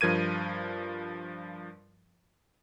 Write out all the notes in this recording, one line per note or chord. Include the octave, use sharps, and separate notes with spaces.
G2 F3 A#4 G#6 D#7